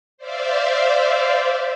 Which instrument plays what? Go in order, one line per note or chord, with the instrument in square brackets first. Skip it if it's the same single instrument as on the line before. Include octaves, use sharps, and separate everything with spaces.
[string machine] C5 D5 E5 F5